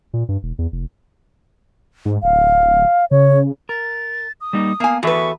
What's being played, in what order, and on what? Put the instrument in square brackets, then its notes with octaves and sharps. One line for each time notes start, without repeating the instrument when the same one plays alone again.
[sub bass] A#2
G2
E1
E2
F1
[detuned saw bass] G#2
[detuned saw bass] D1 [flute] F5
[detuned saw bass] C#3 [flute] C#5
[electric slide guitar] A#4 [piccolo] A6
[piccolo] D#6
[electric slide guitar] G3 A#3 D#4
[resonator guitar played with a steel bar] A#3 G#5 [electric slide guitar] B3 F5
[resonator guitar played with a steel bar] E2 B4 [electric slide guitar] F#4 A4 E5 [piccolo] C#6